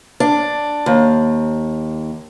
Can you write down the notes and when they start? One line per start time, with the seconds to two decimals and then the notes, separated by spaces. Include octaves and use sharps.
0.20 D4
0.86 D#2